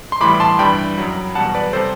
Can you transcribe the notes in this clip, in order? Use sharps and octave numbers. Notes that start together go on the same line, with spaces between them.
C6
A2 E3 G3 B5 D6
D6
A5 C6
G2 E3 G3 G5 B5
F#2 F#3
E2 B2 G3 F#5 A5
B4 D5
C3 G3 A4 C5